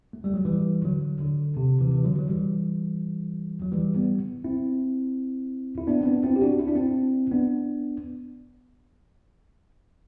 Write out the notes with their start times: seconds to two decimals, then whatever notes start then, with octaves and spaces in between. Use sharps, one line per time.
0.13 A3
0.24 G3
0.34 F#3
0.45 E3 G3
0.85 D3 F#3
1.21 D3
1.57 C3
1.80 C3 E3
1.94 E3
2.05 D3 F#3
2.18 F#3
2.29 E3 G3
3.62 F#3
3.72 E3 G3
3.96 G3 B3
4.44 C4 E4
5.78 E4
5.87 B3 D4
6.01 C4
6.05 B3 D4
6.24 C4 E4
6.36 G4
6.42 D4 F#4
6.59 E4
6.67 D4
6.75 C4 E4
7.31 B3 D4